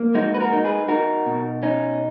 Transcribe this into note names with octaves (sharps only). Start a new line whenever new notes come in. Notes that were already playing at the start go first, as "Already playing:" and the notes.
Already playing: A#3
G#3 D#4 F#4
B4
F#4 A#4
D#4
G#4 B4
D#4 F#4 A#4
B2
C#4 D#4